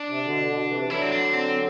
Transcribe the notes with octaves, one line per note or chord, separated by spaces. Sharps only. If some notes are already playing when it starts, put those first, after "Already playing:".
Already playing: D4
C3
B2 D3
B2 D3
D3
C3 E3
E3
D3 F#3 E4
C4
D4
C4